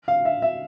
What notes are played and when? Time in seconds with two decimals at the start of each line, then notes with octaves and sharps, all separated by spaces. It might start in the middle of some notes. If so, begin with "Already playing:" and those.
0.08 F5
0.25 E5
0.42 E5